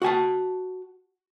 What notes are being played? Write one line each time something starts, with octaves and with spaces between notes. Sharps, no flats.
F#4 F#5 G#5 A5